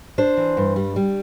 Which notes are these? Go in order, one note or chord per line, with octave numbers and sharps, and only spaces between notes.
D4 C5
E3
G2
G3
G3